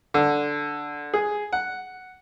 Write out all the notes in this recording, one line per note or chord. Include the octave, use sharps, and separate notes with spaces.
D3
G#4
F#5